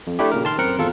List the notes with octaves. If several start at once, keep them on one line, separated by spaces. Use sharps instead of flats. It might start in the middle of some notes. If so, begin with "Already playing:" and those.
F2
A3 D4 E4 G4
A#2 C#3 A#4
D#3 A5 C6 F6
F#2 C4 A#4 F#6 C#7
G#1 E2 F4 A4